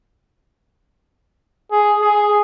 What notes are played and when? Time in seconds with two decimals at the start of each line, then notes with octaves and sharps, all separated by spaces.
1.71 G#4
2.02 G#4